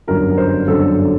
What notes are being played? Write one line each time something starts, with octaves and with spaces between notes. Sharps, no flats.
G1 F#2 D3 F#3 A#4
C5
G1 F#2 D3 F#3 A4